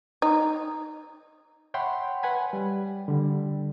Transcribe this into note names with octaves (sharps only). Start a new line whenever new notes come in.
D#4
C#5 E5 F#5 G5 B5 C6
B4 F#5 G#5 B5
G3
D3 G3